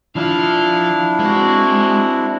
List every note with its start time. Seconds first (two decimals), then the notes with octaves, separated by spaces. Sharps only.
0.16 F3 D4 E4 F4 F5
1.19 G#3 C4 F#4